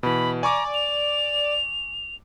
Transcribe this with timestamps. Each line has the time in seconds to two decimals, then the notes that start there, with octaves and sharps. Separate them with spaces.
0.03 B2 E3 B5
0.43 D5 G#5 A#5 C#6 D6
0.74 F7